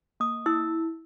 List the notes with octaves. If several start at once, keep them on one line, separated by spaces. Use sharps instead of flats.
A#3 D#6
E4 E6